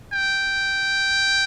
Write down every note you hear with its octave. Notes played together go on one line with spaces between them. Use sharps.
G5